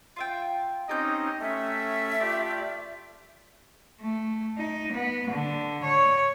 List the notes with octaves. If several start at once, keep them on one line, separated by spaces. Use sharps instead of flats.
F4 E5 G5
C4 C#4 D#4 G4 D#5 G6
A3 C#4 E5
F4 G4 D5 D6
A3
D#4
B3
D3
C#5